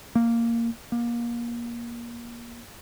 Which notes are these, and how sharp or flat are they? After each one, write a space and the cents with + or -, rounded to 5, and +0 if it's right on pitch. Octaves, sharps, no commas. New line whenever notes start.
A#3 -10
A#3 +25